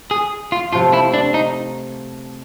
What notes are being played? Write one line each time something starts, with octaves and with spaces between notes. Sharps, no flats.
G#4
F4
C3 F3 A3 F4
E4
D4
D#4